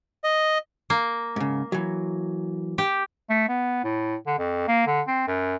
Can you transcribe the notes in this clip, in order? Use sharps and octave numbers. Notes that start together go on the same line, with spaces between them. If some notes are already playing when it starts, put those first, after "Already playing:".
D#5
A#3
G#2 C#3
E3 F#3
G4
A3
B3
A2
D3
F2
A#3
D3
C4
F#2